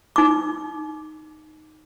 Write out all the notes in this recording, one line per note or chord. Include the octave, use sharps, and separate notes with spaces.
D#4 D6